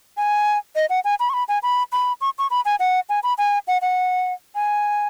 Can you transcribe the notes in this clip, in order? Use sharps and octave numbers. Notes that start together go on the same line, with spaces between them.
G#5
D#5
F#5
G#5
B5
C#6
B5
G#5
B5
B5
C#6
C#6
B5
G#5
F#5
G#5
B5
G#5
F#5
F#5
G#5